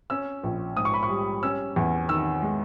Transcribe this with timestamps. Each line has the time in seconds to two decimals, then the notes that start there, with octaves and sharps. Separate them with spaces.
0.10 C#4 E6
0.43 A#1
0.76 G#2 D#6
0.85 C#6
0.94 B5
1.03 C#6
1.10 G3
1.43 C#4 E6
1.76 E2
2.09 D#3 E6
2.42 G#3